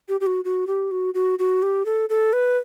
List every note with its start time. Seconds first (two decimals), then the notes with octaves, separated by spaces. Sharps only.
0.09 G4
0.21 G4
0.26 F#4
0.45 F#4
0.67 G4
0.91 F#4
1.14 F#4
1.39 F#4
1.63 G4
1.85 A4
2.09 A4
2.33 B4